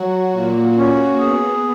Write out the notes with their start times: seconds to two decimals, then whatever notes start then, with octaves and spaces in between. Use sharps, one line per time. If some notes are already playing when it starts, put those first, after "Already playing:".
Already playing: F#3 F#4
0.32 A#2 A#3
0.75 A#3 C#4
1.19 B3 G#4